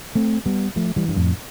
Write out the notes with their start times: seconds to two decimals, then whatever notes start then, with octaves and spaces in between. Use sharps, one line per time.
0.15 A3 C4
0.46 G3 B3
0.76 F3 A3
0.96 E3 G3
1.08 G2
1.16 F2 A2